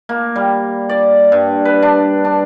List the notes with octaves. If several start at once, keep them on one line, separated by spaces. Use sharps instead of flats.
A#3
G3
D5
G2
B4
D4
D4